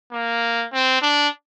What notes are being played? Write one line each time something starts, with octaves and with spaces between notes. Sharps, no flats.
A#3
C4
D4